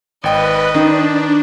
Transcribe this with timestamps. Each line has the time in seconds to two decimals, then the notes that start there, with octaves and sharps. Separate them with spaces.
0.24 G#1 B4 D#5 G5
0.74 D#3 D4 D#4